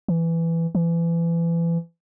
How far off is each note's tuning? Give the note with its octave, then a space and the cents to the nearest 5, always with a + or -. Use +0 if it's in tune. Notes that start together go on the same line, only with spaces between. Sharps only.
E3 +10
E3 +30